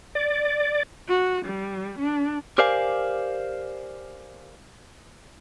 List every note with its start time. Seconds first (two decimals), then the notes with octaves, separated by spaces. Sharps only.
0.15 D5
1.08 F#4
1.45 G3
1.99 D4
2.58 G4 A#4 C5 D5 F5 G#5